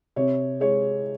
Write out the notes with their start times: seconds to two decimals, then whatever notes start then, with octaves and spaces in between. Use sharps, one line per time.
0.16 C3 C#5
0.60 G#3 C#5